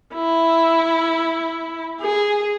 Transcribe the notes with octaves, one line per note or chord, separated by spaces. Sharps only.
E4
G#4